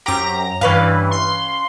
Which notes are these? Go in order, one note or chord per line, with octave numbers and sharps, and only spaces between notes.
F#2 C4 G4 A#5
G2 E3 C#4 B4 F5
C6